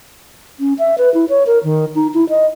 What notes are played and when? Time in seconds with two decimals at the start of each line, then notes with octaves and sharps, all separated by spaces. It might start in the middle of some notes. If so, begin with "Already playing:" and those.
0.60 C#4
0.79 E5
0.98 B4
1.14 E4
1.29 C#5
1.47 A#4
1.64 D#3
1.95 D#4
2.14 E4
2.29 D#5